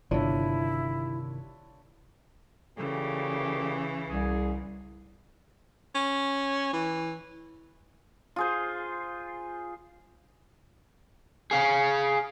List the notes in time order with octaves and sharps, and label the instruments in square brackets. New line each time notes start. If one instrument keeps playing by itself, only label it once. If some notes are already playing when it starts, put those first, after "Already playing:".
[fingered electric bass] G1 [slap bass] C3 D#3 [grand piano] D4 F4 C#5 [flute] E4
[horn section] A#2 A3 G4 [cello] C#3 E3
[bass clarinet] C2 [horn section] G#4
[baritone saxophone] C#4
E3
[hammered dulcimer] F4 G#4 C5
[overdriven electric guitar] G#4 F5